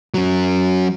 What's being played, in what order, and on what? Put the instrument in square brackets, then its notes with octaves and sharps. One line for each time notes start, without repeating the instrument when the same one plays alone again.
[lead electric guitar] F#3 C#4